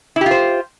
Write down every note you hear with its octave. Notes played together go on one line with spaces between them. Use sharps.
E4 F4 G4 C5